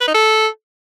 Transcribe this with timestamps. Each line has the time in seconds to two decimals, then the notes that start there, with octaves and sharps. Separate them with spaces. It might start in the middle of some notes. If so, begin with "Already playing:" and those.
0.01 B4
0.08 D#4
0.14 A4